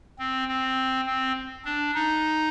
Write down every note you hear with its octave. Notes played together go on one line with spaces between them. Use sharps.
C4
C4
C4
D4
D#4